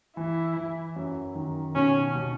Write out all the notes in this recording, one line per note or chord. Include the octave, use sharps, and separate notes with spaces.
E3 E4
E3
F#2
D#3
B2 C#4
B2